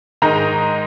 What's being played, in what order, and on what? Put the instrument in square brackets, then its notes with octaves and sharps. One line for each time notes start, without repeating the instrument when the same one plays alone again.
[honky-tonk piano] G#2 D#3 G#3 D#4 A#5